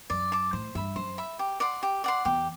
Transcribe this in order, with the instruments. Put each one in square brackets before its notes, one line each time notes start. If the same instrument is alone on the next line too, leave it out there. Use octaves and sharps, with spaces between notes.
[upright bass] F#2 [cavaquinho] D5
[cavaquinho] A5 D6
[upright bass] A2 [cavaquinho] C5
[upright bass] G2 [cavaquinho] E5 B5
[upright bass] F#2 [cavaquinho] C5
[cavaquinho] E5 B5
G4
D5 F#5 C6
G4
D5 F#5 C6
[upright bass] E2 [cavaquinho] G4